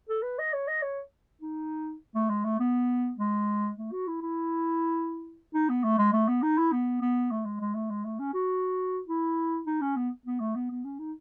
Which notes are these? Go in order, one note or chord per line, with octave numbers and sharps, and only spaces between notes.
A4
B4
D#5
C#5
D#5
C#5
D#4
A3
G#3
A3
B3
G#3
A3
F#4
E4
E4
D#4
B3
A3
G#3
A3
B3
D#4
E4
B3
B3
A3
G#3
G#3
A3
G#3
A3
C#4
F#4
E4
D#4
C#4
B3
B3
A3
B3
B3
C#4
D#4